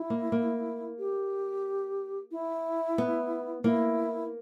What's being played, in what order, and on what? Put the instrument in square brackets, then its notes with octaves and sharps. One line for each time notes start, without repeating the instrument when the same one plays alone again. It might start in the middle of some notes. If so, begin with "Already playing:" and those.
Already playing: [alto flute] E4
[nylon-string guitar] A#3
A#3
[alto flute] G4
E4
[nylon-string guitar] B3
[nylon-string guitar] A#3 [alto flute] E4